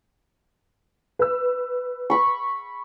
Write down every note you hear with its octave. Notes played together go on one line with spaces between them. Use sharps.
B4 E6
B5 C#6